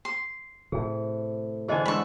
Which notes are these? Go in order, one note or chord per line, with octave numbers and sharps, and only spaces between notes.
C6
A2 C3 G#4
E2 D3 G#4 C5 D#5 G#5
G#2 D4 B5 C#6 E6